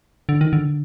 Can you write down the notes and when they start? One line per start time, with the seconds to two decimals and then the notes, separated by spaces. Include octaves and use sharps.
0.29 D3
0.41 D#3
0.53 D3